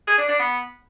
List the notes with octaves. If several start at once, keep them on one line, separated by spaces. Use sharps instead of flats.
G#4
D4
D4
B3